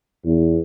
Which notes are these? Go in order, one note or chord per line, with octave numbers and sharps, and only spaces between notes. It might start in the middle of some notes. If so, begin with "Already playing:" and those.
E2